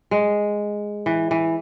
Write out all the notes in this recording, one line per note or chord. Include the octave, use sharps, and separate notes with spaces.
G#3
E3
E3